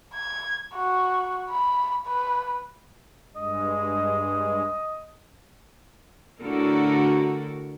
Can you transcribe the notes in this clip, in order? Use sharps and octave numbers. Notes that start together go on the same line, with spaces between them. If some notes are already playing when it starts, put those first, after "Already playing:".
G#6
F#4
B5
B4
G2 G#3 D#5
A2 D3 F#4 A4 A#4